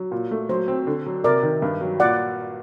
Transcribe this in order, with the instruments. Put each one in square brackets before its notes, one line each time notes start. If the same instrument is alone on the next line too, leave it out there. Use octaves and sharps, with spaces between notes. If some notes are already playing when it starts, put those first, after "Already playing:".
Already playing: [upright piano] F#3
A#2
A3
[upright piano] F#3 [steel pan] C5
[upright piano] C4
D3
F#3
[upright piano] C3 [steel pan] A#4 D5
[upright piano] D#3
G2
F#3
[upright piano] A#2 [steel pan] D5 F#5